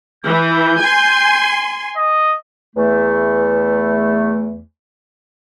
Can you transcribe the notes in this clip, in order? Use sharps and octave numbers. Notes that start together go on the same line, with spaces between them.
E3 G6
G#5 C6
D#5
E2 A3